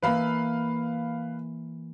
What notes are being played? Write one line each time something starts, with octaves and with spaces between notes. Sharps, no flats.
E3 A#3 B4 F5 B5